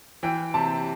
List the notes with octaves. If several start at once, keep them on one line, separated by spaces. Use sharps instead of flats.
E3 G5
C3 A5